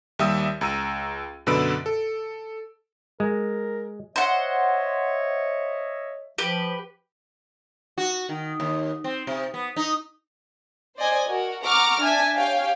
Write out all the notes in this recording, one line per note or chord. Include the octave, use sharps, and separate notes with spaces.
D#2 G3 E5 D#6 E6
C#2 A#5 E6 D#7
F#2 B2 D3 B4 E6 D7
A4
G#3 A#4
C5 C#5 D#5 E5 F#5
F3 G4 B4
F#4
D#3
D#2
C4
C3
B3
D#4
C5 D5 D#5 G#5
F#4 A#4
F#5 A#5 C#6 D6 F6
D4 E5 G#5 A5
G4 C#5 F5 G5 G#5